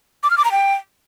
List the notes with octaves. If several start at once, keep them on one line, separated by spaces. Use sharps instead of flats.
D6
F6
D6
A#5
G5